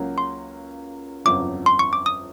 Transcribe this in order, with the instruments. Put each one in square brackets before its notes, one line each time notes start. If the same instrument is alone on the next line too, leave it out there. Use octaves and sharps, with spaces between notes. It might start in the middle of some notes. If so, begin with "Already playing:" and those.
Already playing: [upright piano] C#2 C#3 F#3 A#3 C#4
[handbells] C6
[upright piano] G1 F2 C#3 F#3 [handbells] D6
[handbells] C6
C#6
D6
D#6